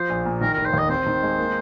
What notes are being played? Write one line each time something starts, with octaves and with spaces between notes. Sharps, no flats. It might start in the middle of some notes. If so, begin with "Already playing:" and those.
Already playing: F3 C5
A#1
A#2
D#3 A#4
F1 A#4
C5
D#2 D#5
C4 C5
D#3
G#3
A#3